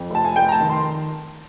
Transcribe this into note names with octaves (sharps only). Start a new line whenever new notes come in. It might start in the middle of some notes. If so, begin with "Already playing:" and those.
Already playing: F2
F1 A5
G#5
F1 G5
A#5
A5
D#3
C6